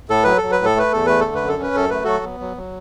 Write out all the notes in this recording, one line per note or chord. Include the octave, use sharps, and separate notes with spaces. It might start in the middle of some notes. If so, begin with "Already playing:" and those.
A2 A4
F#3 B4
A4
F#3
B4
A2
A4
A3 B4
E2 A4
A3 B4
A4
D3
B4
F#2
A4
C#4 B4
F#2 A4
A3 B4
F#3 F#4 A4
B3
F#3
F#3